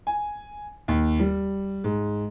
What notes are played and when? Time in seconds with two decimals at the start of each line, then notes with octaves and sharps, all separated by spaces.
0.07 G#5
0.88 D#2
1.20 G3
1.84 G#2